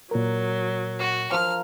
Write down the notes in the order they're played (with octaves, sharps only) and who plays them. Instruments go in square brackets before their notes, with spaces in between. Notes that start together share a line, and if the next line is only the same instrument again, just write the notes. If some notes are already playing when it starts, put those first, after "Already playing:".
[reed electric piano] A#2 A#4 [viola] F#3
[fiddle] F#4
[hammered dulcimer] F3 A#4 [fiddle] F6